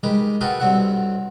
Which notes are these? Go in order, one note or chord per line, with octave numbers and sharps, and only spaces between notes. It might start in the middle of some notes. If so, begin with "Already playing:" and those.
D#3 G#3 G4 B4
F4 F#4 G#4 A4 B4 G5
B1 G2 C4 E4 F#5